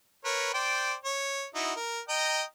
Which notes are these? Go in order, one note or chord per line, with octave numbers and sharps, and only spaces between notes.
A#4 B4 C#5
C5 D5 G5
C#5
D#4 E4 F#4
A#4
D#5 G5 A#5